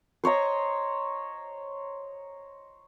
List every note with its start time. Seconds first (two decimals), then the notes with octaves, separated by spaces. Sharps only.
0.24 C5 C#5 D#5 A#5